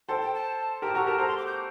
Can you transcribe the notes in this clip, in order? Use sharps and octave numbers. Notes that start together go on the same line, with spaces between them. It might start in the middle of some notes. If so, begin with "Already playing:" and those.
A4 C5 G5
G5
A5
G4 A#4 A5
F#4 A4 A#5
G4 A#4 A5
A4 C5 A#5
C6
D6
G6